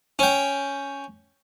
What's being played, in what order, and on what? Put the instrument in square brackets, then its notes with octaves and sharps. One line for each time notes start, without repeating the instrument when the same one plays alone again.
[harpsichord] C#4 G5